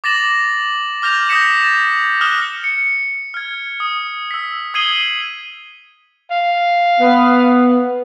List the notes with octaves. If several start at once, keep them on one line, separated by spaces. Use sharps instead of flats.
D6 A6 A#6 E7 F#7
D6 F6 G6 A#6 F7
D#6 G6 A#6 B6 C#7 E7
A6 E7
D#6 F6 F#6 E7 G7
C#7
F6 G#6
D#6
E6 B6
D#6 G#6 C7 D#7 F#7 G7
F5
B3